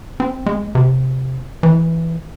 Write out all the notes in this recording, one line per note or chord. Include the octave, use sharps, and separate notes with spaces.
C4
G#3
C3
E3